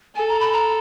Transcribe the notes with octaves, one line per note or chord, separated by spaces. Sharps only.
A4 G#5
A#5
B5
A#5